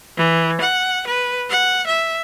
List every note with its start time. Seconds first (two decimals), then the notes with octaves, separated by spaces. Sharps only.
0.17 E3
0.60 F#5
1.07 B4
1.50 F#5
1.87 E5